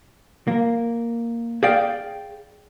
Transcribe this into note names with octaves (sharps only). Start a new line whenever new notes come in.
A#3
G#4 D5 F5 G5